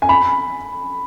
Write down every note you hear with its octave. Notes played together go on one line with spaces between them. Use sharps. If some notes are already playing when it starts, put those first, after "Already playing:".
G#5
B5